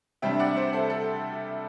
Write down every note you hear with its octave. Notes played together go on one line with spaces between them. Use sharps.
C3 G3 D4 E5 G5
D5 F#5
C5 E5
A4 C5
A4